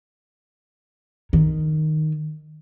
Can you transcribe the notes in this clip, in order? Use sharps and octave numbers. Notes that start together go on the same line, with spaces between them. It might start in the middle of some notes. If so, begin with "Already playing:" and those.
D#3